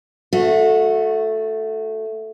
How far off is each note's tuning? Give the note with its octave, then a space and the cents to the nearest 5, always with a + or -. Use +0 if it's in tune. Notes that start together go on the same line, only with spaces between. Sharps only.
A3 +0 F#4 -25